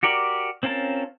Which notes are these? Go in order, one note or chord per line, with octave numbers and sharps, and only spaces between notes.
F#4 G4 A#4 D5
C4 C#4 F4 A#4 A5